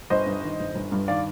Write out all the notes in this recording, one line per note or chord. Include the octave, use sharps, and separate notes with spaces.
G1 C5 D#5
G2
D#3
G1
G1
G2
D#3 D5 F5